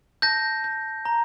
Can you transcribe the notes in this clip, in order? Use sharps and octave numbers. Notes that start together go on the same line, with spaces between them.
A5 G6 A#6
G6
A#5